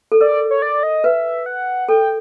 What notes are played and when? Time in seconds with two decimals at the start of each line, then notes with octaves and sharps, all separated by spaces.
0.12 A4
0.21 A#4 D5
0.51 C#5
0.62 D5
0.83 D#5
1.04 B4 E5
1.46 F#5
1.89 A4 G5